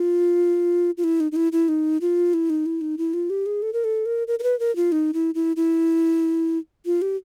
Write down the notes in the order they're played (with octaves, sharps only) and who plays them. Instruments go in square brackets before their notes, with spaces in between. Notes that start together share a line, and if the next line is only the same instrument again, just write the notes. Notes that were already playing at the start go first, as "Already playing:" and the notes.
Already playing: [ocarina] F4
F4
E4
D#4
D#4
E4
E4
D#4
F4
E4
D#4
E4
D#4
E4
F4
G4
G#4
A4
A#4
A4
A#4
A#4
A#4
B4
A#4
F4
D#4
E4
E4
E4
F4
G4